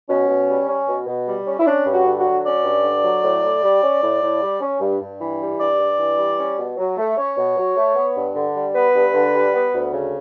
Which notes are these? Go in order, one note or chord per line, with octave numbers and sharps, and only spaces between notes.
B2 C#4
B2
G3
C#4
B2
B2
G3
C#4
E4
C#4 D4
G2
F#4
D3
F#4
F#3
C#4 D5
G2
D3
F#3
A2
A2
G3
C#4
A2
A2
G3
C#4
G2
G2
E3
G3
G2 D5
G2
E3
G3
C#4
B2
F#3
A3
C#4 C#5
B2
F#3
A3
B3
G2
D3
G3
B3 B4
G2
D3
G3
B3
D2
C#3